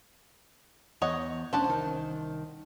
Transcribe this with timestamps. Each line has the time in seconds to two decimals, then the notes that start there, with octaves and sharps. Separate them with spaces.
1.02 E2 C#5 D#5 F#5
1.53 F1 C#4 D4 C5 F#5 A5
1.65 C2 D#3